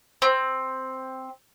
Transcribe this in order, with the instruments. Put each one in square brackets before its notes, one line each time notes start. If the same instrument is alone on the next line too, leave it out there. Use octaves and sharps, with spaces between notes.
[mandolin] C4